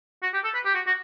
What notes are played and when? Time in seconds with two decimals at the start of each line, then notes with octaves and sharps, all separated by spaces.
0.23 F#4
0.33 G4
0.44 A4
0.54 B4
0.65 G4
0.75 F#4
0.86 F#4